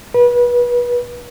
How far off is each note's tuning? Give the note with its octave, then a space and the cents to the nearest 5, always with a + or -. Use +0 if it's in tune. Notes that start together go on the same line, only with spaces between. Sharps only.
B4 -30